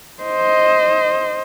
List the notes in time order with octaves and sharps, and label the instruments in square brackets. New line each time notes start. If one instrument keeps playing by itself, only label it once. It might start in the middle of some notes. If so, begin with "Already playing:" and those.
[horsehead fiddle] C5 D#5